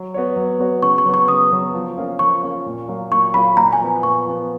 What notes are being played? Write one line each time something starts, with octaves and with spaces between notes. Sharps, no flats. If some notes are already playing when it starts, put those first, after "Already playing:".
Already playing: F#3
B3 F#4 C#5
F#3
B3 F#4 C#5
C#3 C#6
C#6
F#3 B3
C#6
C#3 D#6
F#3 B3
F3
A#3 C#4 F4
F3 C#6
A#3 C#4 F4
A#2
F#3 A#3 F4
A#2 C#6
F#3 A#3 F4 B5
A#2 A#5
G#5
F3 B3
A#2 C#6
F3 B3